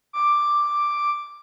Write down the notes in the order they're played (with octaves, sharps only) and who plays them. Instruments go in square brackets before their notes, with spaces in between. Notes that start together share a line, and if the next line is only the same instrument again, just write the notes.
[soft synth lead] D6